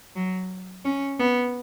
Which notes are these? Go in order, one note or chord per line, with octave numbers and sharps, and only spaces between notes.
F#3
C#4
B3